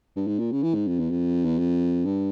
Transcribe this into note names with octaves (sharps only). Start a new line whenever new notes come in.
G2
G#2
A#2
C#3
E3
G#2
F2
E2
F2
E2
F2
G2